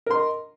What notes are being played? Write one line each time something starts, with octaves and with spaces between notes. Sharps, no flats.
A#4 D#5 C6